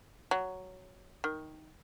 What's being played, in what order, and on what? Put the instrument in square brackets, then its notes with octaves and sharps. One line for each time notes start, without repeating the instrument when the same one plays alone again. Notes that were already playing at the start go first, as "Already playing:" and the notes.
[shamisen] F#3
D#3